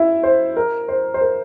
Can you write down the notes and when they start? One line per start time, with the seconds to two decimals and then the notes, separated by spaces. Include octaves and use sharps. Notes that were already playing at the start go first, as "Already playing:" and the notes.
Already playing: E4 E5
0.23 C5
0.57 A#4
0.88 C5
1.14 C5
1.21 A#4